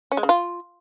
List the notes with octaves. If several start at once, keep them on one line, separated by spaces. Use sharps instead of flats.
C#4
G#3
C#3
F4